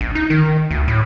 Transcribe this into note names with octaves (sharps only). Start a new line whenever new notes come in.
A#1
D#4
D#3
D2
A2